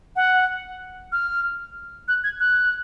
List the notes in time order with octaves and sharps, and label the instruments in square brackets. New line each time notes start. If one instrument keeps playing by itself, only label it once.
[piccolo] F#5
F6
F#6
G#6
F#6